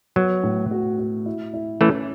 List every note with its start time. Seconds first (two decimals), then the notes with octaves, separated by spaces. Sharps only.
0.16 F#3 B3
0.43 A2
0.71 F#4
0.99 F#4
1.26 E4
1.54 E4
1.81 E3 A3 C#4